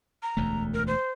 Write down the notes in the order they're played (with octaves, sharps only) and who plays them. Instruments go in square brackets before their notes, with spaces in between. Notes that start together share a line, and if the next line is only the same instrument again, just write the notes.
[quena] A#5
[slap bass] E1 D2 A3
[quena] A#4
C5